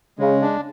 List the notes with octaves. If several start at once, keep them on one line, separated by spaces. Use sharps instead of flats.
C#3 G#3
D4